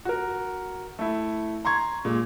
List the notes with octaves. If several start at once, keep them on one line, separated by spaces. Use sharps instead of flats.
F#4 A#4
A3 E4
A#5 C6 C#6 G#6
A#2 G#3